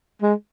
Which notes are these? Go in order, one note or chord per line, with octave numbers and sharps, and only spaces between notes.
G#3